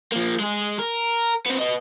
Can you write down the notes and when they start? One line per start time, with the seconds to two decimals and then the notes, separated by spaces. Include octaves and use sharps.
0.12 F3 A#3
0.39 G#3 G#4
0.79 A#4
1.46 B3 C4
1.59 B3 D#5